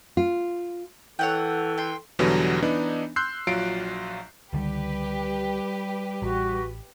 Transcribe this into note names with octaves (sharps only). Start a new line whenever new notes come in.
F4
E3 A4 C#5 F#5 G5
G5 C6
E2 B2 D3 E3 F#3 G3
E3 B3 D4 D#4
C6 E6 F#6 G6 C7
A#1 F#3 F4 C7 D7
C#2 D3 D#3 G3 G4 B4
A1 F#4